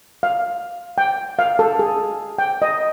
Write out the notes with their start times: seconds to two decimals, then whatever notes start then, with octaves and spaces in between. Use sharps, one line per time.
0.23 F5
0.98 G5
1.39 F5
1.59 A4
1.79 G#4
2.38 G5
2.62 D#5